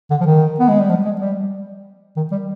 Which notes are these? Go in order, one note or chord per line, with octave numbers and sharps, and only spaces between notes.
D3
F3
D#3
B3
G#3
G3
F3
G#3
G3
D#3
G3